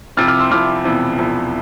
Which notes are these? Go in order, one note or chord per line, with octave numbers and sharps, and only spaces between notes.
C2 C3 F3 F6 A6
D6 F6
C6 E6
C2 C3 F3 D6 F6
E1 E2 C3 F3
E1 E2 C3 F3